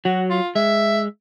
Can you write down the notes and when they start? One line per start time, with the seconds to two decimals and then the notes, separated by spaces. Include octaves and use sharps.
0.05 F#3 F#4
0.30 F4
0.55 G#3 E5